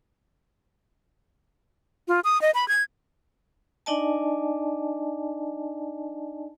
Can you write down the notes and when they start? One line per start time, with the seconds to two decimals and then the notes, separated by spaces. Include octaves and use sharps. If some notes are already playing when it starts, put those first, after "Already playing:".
2.08 F4
2.24 D#6
2.42 D#5
2.54 B5
2.68 G#6
3.86 D4 D#4 D5 D#5 G#5 A5